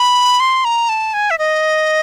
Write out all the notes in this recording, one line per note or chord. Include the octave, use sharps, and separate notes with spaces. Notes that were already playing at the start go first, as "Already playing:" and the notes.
Already playing: B5
C6
A#5
A5
G#5
E5
D#5